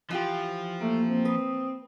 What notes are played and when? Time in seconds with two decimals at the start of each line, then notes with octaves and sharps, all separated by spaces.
0.11 E3 F3 F4 G4
0.81 A3 A#3
1.06 C4
1.25 B4 D#6